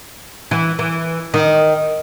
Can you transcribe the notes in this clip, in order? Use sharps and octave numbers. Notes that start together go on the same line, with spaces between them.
E3
E3
D#3